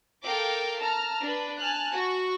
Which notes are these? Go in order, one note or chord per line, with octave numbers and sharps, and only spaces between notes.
A4 A#4 F5 G5 D6
A5 A#5 F6
D4 B4
G#5 A5 F6 F#6
F#4 C#6